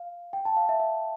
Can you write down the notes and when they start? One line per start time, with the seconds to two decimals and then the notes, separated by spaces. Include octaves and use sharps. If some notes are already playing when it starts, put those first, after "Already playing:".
Already playing: F5
0.33 G5
0.45 A5
0.56 F5
0.69 E5
0.80 E5